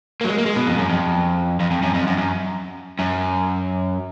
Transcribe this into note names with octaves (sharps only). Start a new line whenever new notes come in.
A#3
F#3
G#3
A#3
G#3
B2
F2
F#2
F2
F2
F2
F#2
F2
F#2
F#2
F#2